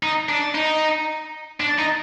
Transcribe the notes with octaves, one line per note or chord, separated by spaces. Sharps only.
D#4
D4
D#4
D4
D#4